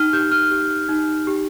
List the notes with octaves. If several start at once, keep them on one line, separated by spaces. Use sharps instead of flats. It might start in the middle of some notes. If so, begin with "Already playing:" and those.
Already playing: D#4 F6
G4 G6
F6
G4
D#4
G4